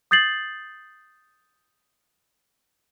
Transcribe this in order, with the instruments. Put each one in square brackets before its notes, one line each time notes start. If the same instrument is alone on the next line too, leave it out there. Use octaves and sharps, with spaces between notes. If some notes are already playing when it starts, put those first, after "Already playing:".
[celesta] D#6 G6 A6 C7 F#7